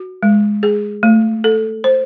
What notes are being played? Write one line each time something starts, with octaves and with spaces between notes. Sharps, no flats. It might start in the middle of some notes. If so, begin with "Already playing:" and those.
Already playing: F#4
G#3
G#4
A3
A4
C5